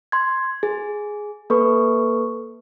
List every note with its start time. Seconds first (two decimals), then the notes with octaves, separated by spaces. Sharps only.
0.12 C6 G#6
0.63 G#4
1.50 A#3 A4 B4 C#6